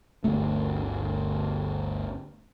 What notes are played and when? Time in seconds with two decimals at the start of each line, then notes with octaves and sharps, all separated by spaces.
0.24 G1 D2 A3